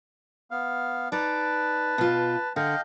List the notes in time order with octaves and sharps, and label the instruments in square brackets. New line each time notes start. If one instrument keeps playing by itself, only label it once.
[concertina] B3 F5
[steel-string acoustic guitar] D#4 D5 [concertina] B4 A5
[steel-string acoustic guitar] B2 F4
[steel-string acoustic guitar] D3 [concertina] D#5 F5 G5